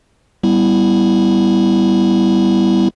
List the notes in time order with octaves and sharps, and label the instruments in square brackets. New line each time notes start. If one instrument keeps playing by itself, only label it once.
[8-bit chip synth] G3 B3 E4